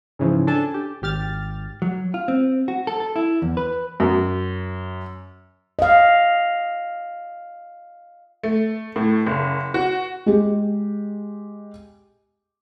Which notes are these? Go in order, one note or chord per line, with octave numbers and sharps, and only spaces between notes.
G#2 C#3 E3 F3
D4 A4 G#5 A5
G4
G#1 G4 F6 A6
F#3
F4
C4
F#4
A4
A4
E4
E2
B4
F#2
D#5 F5
A3
A2
F#1
F#4
G#3 G4